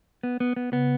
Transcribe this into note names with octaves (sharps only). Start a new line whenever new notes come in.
B3
B3
B3
C#3 B3